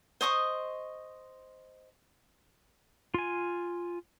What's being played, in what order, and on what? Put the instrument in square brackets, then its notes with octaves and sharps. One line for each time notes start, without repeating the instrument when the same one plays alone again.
[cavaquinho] C5 D#5 C#6 D#6
[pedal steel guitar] F4 G#5